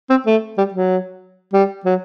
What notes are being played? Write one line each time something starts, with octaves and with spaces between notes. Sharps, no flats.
C4
A3
G3
F#3
G3
F#3